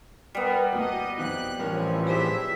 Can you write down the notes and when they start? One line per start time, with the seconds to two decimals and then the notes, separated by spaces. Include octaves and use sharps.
0.35 G3 B3 A#4
0.72 D2 B2 A#3 D#5
1.18 F2 B2 D#3 F#6
1.59 C2 A2 E3 F3 C#4 A#4 F#6
2.08 C4 G4 G#4 E5